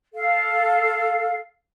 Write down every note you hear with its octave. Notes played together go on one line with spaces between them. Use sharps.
A4 F5